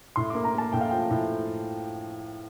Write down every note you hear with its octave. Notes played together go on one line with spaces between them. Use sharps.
A2 C6
A#3 D6
A#5
A#3 A5
A2 G5
F5
F3 G5
A2